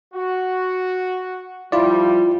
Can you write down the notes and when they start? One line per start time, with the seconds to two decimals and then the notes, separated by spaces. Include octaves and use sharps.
0.13 F#4
1.72 F3 G3 E4 F4 D5